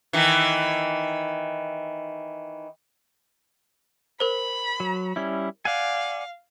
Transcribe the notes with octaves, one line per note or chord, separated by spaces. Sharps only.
D#3 E3
A#4 C5 B5
F#3
G3 C#4 E4
D5 F5 F#5 G#5